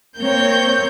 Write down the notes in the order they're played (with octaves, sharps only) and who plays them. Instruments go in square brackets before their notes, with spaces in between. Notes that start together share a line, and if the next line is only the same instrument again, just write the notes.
[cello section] A#3 C4 [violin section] C#5 G6